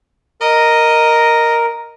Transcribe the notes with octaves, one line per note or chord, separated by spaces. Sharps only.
A#4 D#5